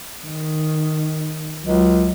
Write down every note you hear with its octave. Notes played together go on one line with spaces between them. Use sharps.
D#3
C#2 F#3